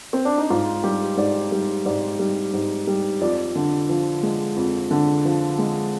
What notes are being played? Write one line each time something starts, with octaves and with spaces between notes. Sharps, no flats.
C4
D4
D#4
G#2 F4
G3 G4
G#2 D5
G3
G#2 D5
G3
G#2
G3
F2 D5
D3
F3
G#3
F2
D3
F3
G#3